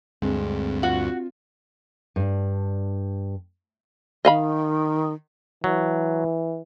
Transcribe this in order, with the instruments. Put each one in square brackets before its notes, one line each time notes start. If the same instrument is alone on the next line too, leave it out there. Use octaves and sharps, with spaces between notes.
[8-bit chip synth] D2 G2 [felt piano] G#3 [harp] C4 D4
[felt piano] F4 [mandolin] F#4
[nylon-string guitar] G2 D4
[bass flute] D#3 [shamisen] D#5 F5 B5
[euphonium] E3 [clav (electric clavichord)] F#3